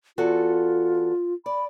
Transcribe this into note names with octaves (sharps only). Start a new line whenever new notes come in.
E2 F4 F#4 A4
D5 B5